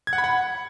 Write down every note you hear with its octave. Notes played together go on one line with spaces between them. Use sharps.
G#6
F#5
B5
F#5